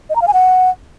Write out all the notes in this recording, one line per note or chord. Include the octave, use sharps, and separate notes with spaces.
D#5
A#5
F5
G#5
F#5